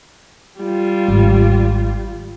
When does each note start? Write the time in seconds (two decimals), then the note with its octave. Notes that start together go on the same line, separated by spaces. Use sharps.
0.60 G3 F4
1.08 G#1